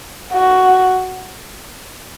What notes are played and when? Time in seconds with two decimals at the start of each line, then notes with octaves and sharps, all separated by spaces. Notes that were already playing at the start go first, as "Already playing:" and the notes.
0.33 F#4